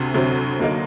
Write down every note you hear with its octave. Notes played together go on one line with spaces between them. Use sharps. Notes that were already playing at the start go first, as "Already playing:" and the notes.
Already playing: D2 C3 C4
D2 C3 F#3 C4
D2 D3 F#3 A#3 D#4